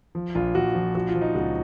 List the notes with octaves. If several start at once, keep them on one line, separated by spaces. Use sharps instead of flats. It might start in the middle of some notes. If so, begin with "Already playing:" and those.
F3
A#1 F4
A#1 F#4
F3
F3 F#4
F4
F3
D#4
C#2 F#4